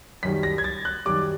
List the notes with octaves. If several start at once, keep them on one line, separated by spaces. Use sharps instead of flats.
F#2 D#3 G3 B6
A#6
G#6
A6
F#6
F#2 D#3 G3 D6